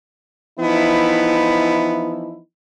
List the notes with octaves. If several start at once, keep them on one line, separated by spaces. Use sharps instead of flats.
E3 F3 B3 D#4 E4